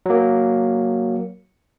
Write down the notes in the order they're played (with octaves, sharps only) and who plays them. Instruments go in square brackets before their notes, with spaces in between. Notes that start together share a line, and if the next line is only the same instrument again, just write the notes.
[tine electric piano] F#3 A#3